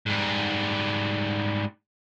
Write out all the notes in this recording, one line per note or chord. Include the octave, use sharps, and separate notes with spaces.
G#2 G3